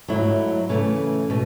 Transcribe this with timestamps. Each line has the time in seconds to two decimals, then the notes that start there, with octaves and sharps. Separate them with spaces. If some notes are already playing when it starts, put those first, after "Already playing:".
0.08 G#2 F#3 A3 E4
0.69 C#3 E3 A3
1.30 B2 A3